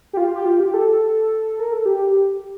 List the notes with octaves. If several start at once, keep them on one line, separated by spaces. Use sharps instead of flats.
G4
F4
G4
F4
G4
A4
A#4
A4
G4